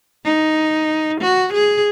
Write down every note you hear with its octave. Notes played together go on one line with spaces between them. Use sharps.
D#4
F#4
G#4